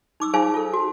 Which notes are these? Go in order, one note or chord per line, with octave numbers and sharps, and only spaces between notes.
D#4 D6 E6
D#4 F4 G#4 C5 F5 G#5
F4 A4
F#4